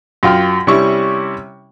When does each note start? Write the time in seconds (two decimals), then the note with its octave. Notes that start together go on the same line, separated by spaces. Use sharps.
0.23 F#2 F4 G5 F6
0.67 C3 G3 C#4 E4 C#6